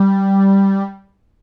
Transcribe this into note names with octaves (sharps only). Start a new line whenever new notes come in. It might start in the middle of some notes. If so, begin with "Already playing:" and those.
Already playing: G3